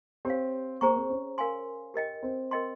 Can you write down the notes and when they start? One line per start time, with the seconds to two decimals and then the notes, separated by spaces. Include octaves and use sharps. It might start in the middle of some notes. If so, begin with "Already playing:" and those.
0.25 C4 G4 C#5 F5
0.81 A#3 G#4 C5 G5 A#5 C#6
0.96 C4
1.10 C#4
1.38 A#4 F5 G#5 C6
1.94 G4 A#4 D#5 G5
2.23 C4
2.51 A#4 D#5 G5 C6